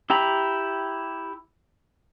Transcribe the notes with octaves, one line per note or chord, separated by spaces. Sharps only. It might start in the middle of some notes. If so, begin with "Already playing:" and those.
E4 G4 G5 A#5 B5